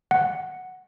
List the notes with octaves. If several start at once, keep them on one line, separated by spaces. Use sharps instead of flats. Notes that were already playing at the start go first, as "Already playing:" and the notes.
F#5